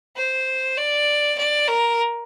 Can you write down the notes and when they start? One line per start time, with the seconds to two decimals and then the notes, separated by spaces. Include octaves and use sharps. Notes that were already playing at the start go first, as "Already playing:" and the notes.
0.17 C5
0.77 D5
1.38 D5
1.68 A#4